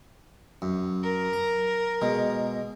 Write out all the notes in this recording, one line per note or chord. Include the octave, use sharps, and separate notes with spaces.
F#2
A#4
A#5
B2 G#3